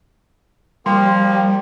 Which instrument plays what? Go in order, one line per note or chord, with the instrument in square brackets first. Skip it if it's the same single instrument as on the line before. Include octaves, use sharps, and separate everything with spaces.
[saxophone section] F3 A#3 [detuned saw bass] G3 [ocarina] G5 [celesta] C6